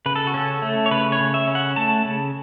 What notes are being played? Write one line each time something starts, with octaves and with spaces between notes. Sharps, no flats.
C#3 B4
A4
F#4
C#4 A4
A3
C#5
C#3 B4
C#5
C#3
E5
C#4
F#5
A3 A5
C#3